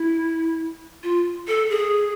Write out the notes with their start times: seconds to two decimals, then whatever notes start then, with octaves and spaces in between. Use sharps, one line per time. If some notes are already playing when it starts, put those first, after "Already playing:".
Already playing: E4
1.04 F4
1.48 A4
1.70 G#4